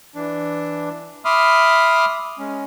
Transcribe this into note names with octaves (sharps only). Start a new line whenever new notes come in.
E3 D4
E5 B5 C6 D6 D#6 F6
G#3 C#4